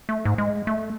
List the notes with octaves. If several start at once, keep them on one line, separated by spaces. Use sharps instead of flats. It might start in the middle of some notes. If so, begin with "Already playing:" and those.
A3
G#2
G#3
A3